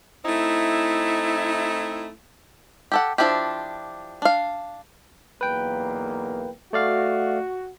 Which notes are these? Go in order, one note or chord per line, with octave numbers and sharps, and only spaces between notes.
A3 C4 D#4 E4
G4 A4 F#5
F3 D4 E4 F4 G4
D4 F5
B1 E2 A#3 B4 G5
A3 F#4 D5 F5